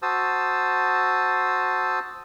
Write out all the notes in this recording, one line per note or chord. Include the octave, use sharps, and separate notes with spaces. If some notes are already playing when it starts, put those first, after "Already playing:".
F#4 C5 A5 D#6 E6